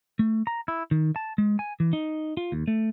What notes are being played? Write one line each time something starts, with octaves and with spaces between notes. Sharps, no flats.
A3
A#5
E4
D#3
A5
G#3
G#5
E3
D#4
F4
D#2
A3